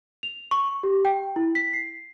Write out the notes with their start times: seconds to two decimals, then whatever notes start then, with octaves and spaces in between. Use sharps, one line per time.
0.23 F7
0.51 C#6
0.83 G4
1.05 G5
1.36 E4
1.55 B6
1.73 C7